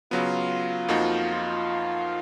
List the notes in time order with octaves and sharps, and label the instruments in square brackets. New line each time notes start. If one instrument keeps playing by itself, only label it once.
[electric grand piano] C#3 F#3 B3 [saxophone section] F4
[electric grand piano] F2 F3 A#3 D#4 F#4